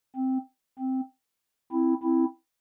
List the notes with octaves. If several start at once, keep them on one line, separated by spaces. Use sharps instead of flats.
C4
C4
C4 E4
C4 E4